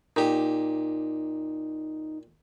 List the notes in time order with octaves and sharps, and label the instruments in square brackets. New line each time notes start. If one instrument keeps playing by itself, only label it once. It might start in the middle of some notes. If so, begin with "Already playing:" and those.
[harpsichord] A#2 G4 [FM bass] D#4